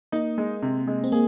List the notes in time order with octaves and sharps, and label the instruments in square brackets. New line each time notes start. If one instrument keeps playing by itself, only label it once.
[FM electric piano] A#3 [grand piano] D#4
[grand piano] G#3
C3
G#3
[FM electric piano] C4
[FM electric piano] A#3 [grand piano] G#4